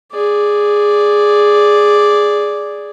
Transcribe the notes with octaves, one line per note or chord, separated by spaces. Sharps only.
G#4 D5